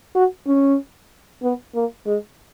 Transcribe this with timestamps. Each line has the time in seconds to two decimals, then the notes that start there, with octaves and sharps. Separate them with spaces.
0.15 F#4
0.47 C#4
1.43 B3
1.75 A#3
2.06 G#3